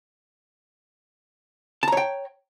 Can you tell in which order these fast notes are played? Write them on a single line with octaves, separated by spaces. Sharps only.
A5 A#5 C#5 G5